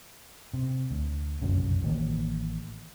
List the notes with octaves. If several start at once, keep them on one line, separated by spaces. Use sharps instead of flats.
C3
D2
F1 B1 F#2 C#3
A1 D#3 F3 A#3